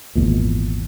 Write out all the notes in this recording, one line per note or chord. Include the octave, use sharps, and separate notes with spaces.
G#1 E2 A#2